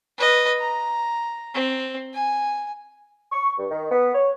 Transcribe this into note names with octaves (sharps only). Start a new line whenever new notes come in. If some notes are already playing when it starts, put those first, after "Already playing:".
B4 D#5
A#5
C4
G#5
C#6
G2
D#3
B3
C#5